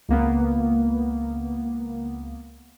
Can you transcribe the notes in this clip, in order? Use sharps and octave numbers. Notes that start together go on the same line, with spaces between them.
C#2 A#3 B3